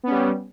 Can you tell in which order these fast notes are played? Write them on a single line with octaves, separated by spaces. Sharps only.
B3 C#4 G3